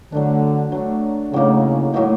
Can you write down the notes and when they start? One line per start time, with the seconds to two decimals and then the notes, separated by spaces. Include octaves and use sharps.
0.12 D3 F#3 A3 D4
0.72 F#3 A3 D4
1.32 A2 C#3 F#3 A#3 D#4
1.93 A2 F#3 A#3 D#4